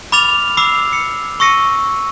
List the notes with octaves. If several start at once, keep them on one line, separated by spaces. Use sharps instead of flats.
B5 D6 F6 A6 F7
B5 D6 E6 C7
C#7
C#6 E6 A#6 C#7 D#7